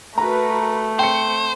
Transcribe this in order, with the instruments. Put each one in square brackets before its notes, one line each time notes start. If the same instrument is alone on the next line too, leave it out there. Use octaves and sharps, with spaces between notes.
[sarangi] A3 [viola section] F#4 A#4 B4 [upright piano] A#5
[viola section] C4 [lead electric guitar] C5 [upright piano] G5 C#7